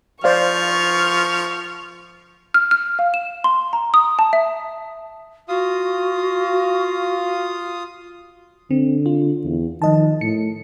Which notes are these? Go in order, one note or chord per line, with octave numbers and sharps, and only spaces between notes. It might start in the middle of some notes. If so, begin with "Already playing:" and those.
F3 C5 D5 F5 C#6 F6
F6
F6
F5
E7
C6
A#5
D#6
A5
E5
F4 F#4 F5 D#6
D3 C4
F4
E2
D#3 F3 D#5 A5
A2 C#7